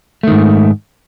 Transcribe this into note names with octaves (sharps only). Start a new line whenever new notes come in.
G#2 D#3 A3